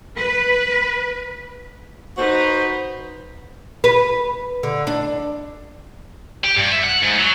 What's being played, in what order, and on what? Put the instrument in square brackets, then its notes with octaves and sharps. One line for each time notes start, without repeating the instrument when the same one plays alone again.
[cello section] B4
[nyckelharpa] D#4 B4 [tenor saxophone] F#4 [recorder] C5
[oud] B4
D3
D4
[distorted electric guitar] G4
G2
E5
F#5
G#2
F#3